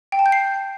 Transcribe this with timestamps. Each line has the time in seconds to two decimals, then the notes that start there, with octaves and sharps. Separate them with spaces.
0.12 G5
0.19 A5
0.26 G6
0.32 C7